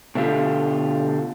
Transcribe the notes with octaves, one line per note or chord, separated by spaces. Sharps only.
B2 D3 A3 F4 G4